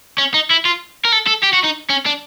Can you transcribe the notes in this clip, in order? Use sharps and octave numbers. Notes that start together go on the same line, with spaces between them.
C#4
D#4
E4
F4
A#4
A4
A4
G4
F#4
D#4
C#4
D4